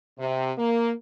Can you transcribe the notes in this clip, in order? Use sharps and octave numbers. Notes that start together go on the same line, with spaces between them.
C3
A#3